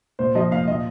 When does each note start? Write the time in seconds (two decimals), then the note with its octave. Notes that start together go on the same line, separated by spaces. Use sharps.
0.19 A#2 C5
0.35 F3 D#5
0.51 A#2 F5
0.67 A#2 D#5